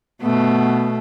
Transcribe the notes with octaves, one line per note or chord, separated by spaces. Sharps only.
B2 A3 B3